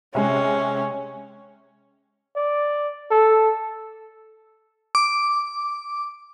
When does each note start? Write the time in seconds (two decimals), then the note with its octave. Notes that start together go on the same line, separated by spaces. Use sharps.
0.15 C3 G#3 C#4
2.36 D5
3.11 A4
4.95 D6